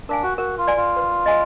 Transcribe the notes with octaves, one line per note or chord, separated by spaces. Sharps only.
D4 A#4 F5 G#5
F#4
F#4 A#4
F4
D5 G#5
F4
B4
D#5 G#5